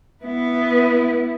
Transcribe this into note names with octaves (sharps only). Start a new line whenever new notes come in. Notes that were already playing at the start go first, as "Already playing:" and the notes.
B3 E4